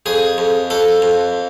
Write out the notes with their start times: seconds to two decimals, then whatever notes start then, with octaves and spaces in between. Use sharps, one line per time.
0.06 F2 G#4
0.38 F2
0.70 F2 A4
1.02 F2